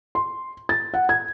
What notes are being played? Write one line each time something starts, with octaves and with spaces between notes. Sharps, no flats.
C6
A6
F#5
G#6